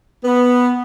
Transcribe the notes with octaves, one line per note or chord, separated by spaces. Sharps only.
B3